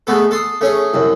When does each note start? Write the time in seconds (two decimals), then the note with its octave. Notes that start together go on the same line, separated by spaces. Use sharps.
0.07 G#3 A3 B3 A4
0.31 A4 C6 D#6
0.61 A3 C#4 G#4
0.94 C2 F#2